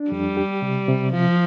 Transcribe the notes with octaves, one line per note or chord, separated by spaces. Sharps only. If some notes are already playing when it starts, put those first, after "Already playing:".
Already playing: D4
F2 G3
G4
C3
C3
F3 F4